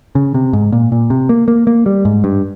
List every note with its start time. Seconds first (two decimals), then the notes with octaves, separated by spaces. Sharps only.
0.15 C#3
0.34 C3
0.53 G#2
0.72 A#2
0.92 A#2
1.10 C3
1.29 A#3
1.48 A#3
1.67 A#3
1.86 G3
2.05 G#2
2.24 G2